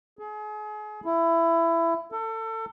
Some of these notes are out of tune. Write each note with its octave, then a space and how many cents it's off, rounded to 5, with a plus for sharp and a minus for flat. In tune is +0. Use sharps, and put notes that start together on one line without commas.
G#4 +35
E4 +20
A4 +30